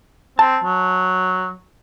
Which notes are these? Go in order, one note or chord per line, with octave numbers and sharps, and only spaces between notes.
C4 A5
F#3